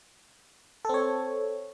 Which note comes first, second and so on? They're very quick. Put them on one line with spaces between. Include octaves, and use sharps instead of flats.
A4 C4 C#5